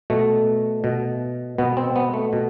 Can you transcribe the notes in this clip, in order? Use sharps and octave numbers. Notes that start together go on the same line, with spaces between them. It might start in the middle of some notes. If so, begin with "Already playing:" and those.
B2 A3
B2
B2 B3
C4
B3
A3
B2